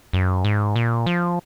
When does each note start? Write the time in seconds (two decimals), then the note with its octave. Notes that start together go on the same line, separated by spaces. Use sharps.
0.13 F#2
0.45 G#2
0.76 A#2
1.06 F3